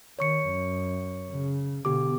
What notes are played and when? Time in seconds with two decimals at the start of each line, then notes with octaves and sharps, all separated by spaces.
0.19 D#3 C#5 C#6 C#7
0.48 F#2
1.31 C#3
1.85 B2 D3 B3 G4 D6